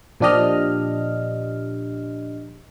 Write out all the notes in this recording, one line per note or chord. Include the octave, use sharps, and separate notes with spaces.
A#2 F3 D4 G4 D#5 F6